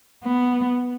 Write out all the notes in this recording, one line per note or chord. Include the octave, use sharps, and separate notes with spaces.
B3